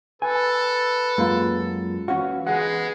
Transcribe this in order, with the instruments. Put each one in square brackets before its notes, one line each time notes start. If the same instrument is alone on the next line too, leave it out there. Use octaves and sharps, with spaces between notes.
[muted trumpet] A4 [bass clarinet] B4 [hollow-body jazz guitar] G#5
[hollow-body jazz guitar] F#2 [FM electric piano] G#3 A#3 F4
[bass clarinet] E3 [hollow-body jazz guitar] C#4 F#4 [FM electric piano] F5
[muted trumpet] G#3 [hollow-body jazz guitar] B3 G#4 F#5 [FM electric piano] C#7